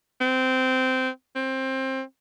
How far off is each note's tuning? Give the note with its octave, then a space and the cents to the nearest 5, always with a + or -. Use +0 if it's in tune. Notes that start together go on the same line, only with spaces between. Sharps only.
C4 -15
C4 +20